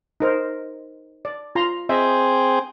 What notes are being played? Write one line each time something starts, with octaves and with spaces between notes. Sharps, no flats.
D#4 A#4 C5
D5
F4 A#5 C6
C4 G#4 D#5 E5 G5